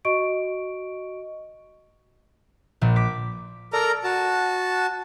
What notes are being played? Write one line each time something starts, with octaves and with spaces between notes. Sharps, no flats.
F#4 D#5 C#6 D7
A#1 A#2
D6 B6
A4 A#4 D5 A#5 F6
F#4 A5